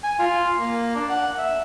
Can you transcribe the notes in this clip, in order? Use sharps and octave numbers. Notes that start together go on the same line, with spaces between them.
G#5
F4
A#3
D4
F#5
E5